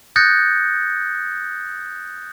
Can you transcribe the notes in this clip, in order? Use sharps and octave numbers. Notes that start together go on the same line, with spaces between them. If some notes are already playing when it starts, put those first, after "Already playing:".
D#6 F#6 G6 A6 A#6 C#7